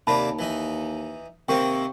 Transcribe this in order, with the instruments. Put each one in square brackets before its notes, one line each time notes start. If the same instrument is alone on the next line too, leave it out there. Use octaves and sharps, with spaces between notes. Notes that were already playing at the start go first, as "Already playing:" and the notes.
[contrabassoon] D#2 [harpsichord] C3 A#3 D4 [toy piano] A5 B5
[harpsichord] E3 D#4
[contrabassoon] C3 [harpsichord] D#3 A#3 C4 [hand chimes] G5 C#6